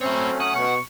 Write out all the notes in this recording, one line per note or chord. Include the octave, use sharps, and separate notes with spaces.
F#3 A3 C4 C#4 E4 C#5
F#5 D#6
B2 C#6